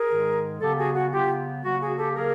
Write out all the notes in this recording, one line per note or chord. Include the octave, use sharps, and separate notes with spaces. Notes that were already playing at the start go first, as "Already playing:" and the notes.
Already playing: G#4 A#4
G#2 D#3 G#3
C#3 F#3 B3 G4 A4
F#4 G#4
F#4
C#3 F#3 B3 F4 G4
C#3 F#3 A#3 F#4
F#4 G#4
G4 A4
C#3 F#3 A#3 G#4 A#4